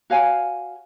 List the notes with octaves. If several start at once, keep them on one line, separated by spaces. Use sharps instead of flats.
F#4 C#5 F5 G#5